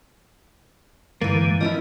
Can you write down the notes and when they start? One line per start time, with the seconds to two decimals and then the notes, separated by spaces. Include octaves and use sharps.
1.22 G2 D3 E3 G#3 A#3
1.61 F3 C#4 E4 D#5